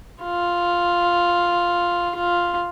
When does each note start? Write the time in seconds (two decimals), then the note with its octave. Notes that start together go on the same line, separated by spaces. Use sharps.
0.23 F4
2.16 F4